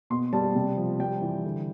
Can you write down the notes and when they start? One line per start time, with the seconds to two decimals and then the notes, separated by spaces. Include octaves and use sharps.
0.10 B2 C6
0.33 G3 A5
0.55 C3
0.77 F3
0.99 G3 G5
1.22 E3
1.44 D3